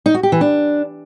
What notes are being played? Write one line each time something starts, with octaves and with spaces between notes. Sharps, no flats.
D#4
F#4
G4
E3
D4